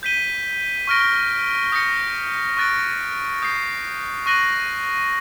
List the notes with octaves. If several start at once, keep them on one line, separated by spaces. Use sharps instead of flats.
G6 B6 D#7 G7
C#6 F6 A#6 D7 G7
D#6 G6 A#6 C#7
C#6 F#6 A6 D7
D#6 G6 C7
C#6 F#6 A#6 D#7 F#7